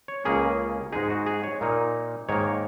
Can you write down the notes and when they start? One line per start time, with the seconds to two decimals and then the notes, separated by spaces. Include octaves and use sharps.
0.08 C#5
0.25 C#2 C#3 A#3 C#4 G#4
0.93 G#2 G#3 D#4 G#4
1.10 F#4
1.26 G#4
1.44 C#5
1.61 A#2 A#3 D#4
2.29 G#2 D#3 A#3 C#5